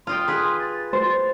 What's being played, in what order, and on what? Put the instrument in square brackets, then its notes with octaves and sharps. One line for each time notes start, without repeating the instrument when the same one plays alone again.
[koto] F4 D#5 G5 [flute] C6
[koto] G#4 B4
[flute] A6
[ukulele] C5